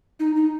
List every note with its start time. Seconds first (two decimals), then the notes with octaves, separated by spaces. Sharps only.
0.20 D#4
0.36 D#4